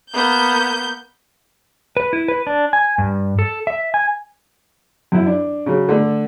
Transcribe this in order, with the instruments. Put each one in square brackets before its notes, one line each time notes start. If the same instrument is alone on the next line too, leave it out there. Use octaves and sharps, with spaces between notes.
[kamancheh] A#3 B3 [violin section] G6
[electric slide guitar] B4
E4
B4
D4
G#5
G2
A4
E5
G#5
[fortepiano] F#2 E4
D4
C#3 F#3
D3 A3